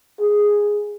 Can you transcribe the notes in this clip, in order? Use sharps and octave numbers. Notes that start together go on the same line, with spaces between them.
G#4